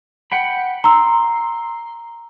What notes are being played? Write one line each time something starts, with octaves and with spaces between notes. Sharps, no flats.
F#5 G5 B5
A#5 C6 E6